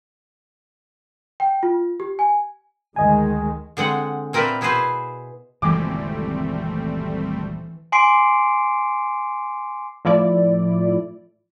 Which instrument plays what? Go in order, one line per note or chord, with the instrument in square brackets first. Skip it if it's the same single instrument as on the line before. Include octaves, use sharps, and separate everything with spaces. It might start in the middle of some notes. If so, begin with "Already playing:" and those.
[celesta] G5
F4
G4
G#5
[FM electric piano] D2 D#5 G#5 [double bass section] D#3 G#3
[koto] D3 G#3 C4 F#5
A#2 C4 A#4 B4 D5 E5
B2 E4 G#4 B4 C5 G#5
[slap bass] D#1 C#2 F#2 [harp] E3 [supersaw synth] G3 A3 C4 [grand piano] D6
[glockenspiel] G#5 C6 D6 C7 D7
[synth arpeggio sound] A2 F3 E4 D5